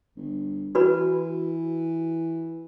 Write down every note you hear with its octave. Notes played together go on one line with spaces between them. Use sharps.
G1
E3 F#4 B4 B5